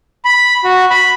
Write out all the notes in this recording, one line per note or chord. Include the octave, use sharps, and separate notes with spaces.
B5
F#4
B5